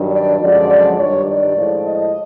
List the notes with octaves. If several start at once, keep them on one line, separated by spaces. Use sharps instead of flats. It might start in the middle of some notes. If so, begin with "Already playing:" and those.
Already playing: G2 D#3 F#3
D5
F#2 D3 F3 G#3 D5
G2 D#3 G3 C#5
D5
A2 F3 G#3
D#5